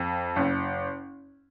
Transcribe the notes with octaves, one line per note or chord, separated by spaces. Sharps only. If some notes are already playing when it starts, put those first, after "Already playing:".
Already playing: F2
F#1